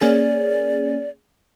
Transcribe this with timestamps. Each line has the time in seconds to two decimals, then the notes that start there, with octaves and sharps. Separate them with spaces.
0.01 A#3 C#4 G#4 D5